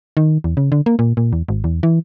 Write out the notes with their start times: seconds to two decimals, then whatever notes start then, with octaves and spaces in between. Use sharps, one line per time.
0.17 D#3
0.44 E2
0.57 C#3
0.72 D3
0.86 A#3
0.99 A#2
1.17 A#2
1.33 E2
1.49 G#1
1.64 E2
1.83 E3